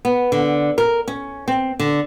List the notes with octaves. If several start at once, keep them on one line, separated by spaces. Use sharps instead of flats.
B3
D3
A#4
C#4
C4
D3